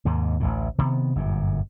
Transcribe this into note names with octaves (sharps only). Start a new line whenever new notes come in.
D#2 G#2 C3
A1 D2 A2
C3 D#3 A#3 B3
G1 F#2 A#2